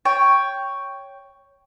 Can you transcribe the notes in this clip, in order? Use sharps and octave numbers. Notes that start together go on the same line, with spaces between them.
C#5 G5